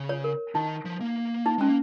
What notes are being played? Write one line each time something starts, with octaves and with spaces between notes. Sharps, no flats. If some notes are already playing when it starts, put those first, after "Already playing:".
Already playing: C#3
C#5
A#4
D#3 D#4
F3
A#3
D#4
G#3 C#4
A#3